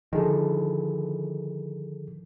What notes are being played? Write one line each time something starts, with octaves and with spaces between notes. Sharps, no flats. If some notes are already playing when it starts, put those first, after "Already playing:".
D3 D#3 F3 G#4 A4